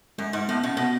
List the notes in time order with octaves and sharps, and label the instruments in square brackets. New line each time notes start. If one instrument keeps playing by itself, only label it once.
[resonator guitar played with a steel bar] F#2 [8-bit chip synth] G#3
[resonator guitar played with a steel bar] G#2
[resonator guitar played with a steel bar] A2 [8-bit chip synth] B3
[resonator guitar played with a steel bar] B2 [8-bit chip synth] C#4
[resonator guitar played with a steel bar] B2 [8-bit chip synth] B3